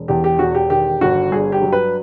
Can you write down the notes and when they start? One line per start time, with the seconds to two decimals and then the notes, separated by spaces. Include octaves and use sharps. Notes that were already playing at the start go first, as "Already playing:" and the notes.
Already playing: E1
0.08 E2 G4
0.24 G4
0.39 E1 F#4
0.55 G4
0.70 D#3 G4
1.01 G1 F#4
1.31 G2 G#4
1.52 G4
1.62 F#3
1.73 B4